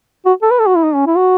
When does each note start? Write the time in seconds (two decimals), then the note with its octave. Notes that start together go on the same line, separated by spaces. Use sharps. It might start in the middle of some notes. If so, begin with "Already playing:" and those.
0.26 F#4
0.42 A4
0.51 B4
0.60 A4
0.67 F#4
0.76 E4
0.84 D#4
0.95 C#4
1.06 E4
1.17 F#4